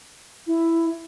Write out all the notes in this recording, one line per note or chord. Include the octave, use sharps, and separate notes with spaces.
E4